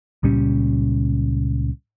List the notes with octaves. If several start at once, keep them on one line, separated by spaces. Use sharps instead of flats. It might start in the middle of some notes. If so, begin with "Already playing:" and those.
C#2 A#2 G3 C#4